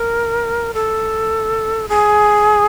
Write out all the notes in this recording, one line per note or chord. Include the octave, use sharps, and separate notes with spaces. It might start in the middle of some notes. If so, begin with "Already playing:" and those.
Already playing: A#4
A4
G#4